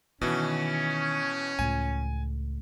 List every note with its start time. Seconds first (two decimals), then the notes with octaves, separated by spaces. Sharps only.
0.21 B2 D#3 E3 C#4
1.59 C#2 A2 G#5